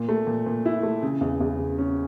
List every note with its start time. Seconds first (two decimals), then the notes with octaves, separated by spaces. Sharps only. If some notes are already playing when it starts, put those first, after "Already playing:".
Already playing: A#2
0.09 A3
0.27 A#2
0.46 A#2
0.65 E4
0.83 A3
1.03 C#3
1.21 E2
1.41 E2
1.59 C#3
1.78 C#4